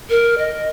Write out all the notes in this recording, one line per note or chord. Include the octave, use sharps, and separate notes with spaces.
A#4
D#5